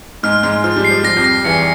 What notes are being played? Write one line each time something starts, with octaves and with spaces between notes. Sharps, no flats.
G#2 G#3 F6
G#2 G#3 F6
F3 F6
G3
C7
F3
G3 A#6
F2 F3
A#6
E2 E3 C#7